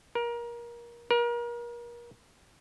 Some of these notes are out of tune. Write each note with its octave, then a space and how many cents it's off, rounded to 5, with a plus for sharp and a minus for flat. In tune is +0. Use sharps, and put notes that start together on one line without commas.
A#4 +25
A#4 +35